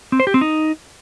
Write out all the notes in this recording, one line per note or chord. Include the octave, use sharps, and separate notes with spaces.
C4
C5
G4
C4
D#4